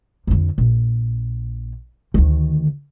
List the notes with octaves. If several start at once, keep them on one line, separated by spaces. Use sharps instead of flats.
F2 D3
A#1
D2 D#3